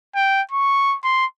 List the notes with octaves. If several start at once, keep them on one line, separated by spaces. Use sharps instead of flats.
G5
C#6
C6